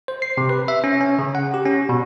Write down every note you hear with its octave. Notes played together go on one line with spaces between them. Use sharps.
C5
C7
C3
B4
E5
C#4
C#4
C#3
F#5
G4
C#4
B2